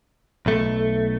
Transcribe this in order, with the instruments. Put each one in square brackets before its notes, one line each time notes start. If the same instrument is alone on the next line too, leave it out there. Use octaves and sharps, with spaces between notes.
[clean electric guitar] B1 A3